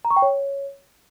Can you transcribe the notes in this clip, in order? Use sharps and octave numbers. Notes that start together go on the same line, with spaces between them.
A#5
C#6
G5
C#5